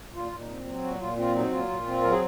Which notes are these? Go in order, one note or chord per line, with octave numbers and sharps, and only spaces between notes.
A#2 F4
A#2
D#4
C4
F#3
A#2 F#4
A#2 F4
C4 F4
F#3 D#4
A#2 F4
A#2
C4
F#3 A#4
G#4